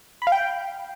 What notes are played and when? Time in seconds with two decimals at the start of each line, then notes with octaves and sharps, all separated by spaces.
0.22 B5
0.27 F5
0.32 G5